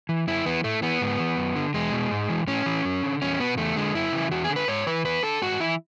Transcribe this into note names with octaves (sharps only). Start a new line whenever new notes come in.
E3
F#2 E4
E3 B3
A2 A3
E3 B3
G#2
E3
F#2
D3
E2 G#3
B2
G#2
E3
A2 C#4
E3
F#2
D3
E2 C#4
B2 B3
E2 A3
D3 G#3
F#2 E4
C#3 E3
E2 F#4
G#4
D3
B4
G#2 C#5
E3 B4
E2 B4
D3 A4
G#2 F#4
E3 E4